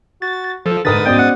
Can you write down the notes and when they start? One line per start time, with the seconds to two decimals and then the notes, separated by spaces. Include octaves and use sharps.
0.22 F#4 A6
0.66 F3 A4
0.85 G#2 D3 A#4 B4 D#6 A6
1.05 B3 C#4 F#4 C5 D5 D#5 G5
1.19 F#5